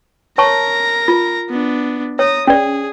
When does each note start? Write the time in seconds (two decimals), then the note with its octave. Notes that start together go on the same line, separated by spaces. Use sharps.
0.38 A#4 C#5 A5 A#5 C#6
1.08 F4
1.50 B3 D4
2.19 C#5 A#5 D#6
2.47 C#4 G#4 D5